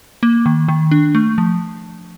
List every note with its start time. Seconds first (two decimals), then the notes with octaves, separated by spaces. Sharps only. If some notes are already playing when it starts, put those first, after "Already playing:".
0.23 A#3
0.46 D#3
0.68 D#3
0.91 D4
1.15 A3
1.38 F3